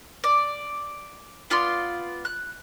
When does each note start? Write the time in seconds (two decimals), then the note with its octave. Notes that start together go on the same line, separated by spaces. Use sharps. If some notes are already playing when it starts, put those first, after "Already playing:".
0.24 D5
1.50 B3 F4 D5 C6
2.25 F#6